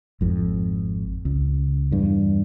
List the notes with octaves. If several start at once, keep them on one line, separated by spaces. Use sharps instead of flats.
G#1 F2
C#2
E2 G2